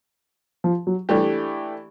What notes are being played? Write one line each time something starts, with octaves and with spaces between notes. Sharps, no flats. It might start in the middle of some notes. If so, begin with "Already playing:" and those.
F3
F#3
E3 G3 A3 D4 G4